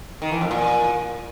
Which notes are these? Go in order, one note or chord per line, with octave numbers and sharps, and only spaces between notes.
D#3
E3
F2
A#2